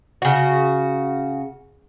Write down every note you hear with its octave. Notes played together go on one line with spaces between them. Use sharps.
C#3 F#4